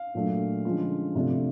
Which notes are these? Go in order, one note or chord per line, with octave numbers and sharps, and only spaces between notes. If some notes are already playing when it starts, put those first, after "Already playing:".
Already playing: F5
A#2 F#3 A3 D4 F4
D3 F3 G#3 C#4 F4
C3 F3 A3 D4 F4